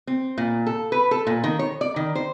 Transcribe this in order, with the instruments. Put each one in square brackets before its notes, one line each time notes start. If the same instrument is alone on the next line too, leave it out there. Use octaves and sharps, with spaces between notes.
[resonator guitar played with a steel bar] C4
A#2
A4
B4
A4
A#2
D#3
C#5
D5
D#3
C5